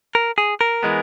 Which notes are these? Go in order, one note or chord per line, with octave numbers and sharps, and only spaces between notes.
A#4
G#4
A#4
E3 G#3 B3